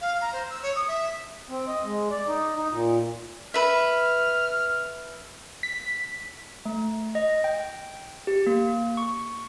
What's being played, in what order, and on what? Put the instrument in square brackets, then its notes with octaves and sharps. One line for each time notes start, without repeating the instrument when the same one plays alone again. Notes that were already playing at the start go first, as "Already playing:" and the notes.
[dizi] F5
A#5
C5
E6
C#5
D#6
E5
[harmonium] C4
D#5
G#3
D5
D#4
D#4
A#2
[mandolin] B4 E5 [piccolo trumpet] F6
[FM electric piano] B6
[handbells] A3
D#5
G5
G4
A#3
C#6